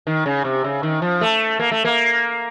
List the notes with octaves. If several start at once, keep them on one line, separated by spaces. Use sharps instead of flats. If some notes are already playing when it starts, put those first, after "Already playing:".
D#3
C#3
C3
C#3
D#3
F3
A3
A#3
A3
A#3